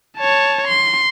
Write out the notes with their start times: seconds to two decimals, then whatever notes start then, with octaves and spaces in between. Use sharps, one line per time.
0.18 C#5 A5
0.68 C6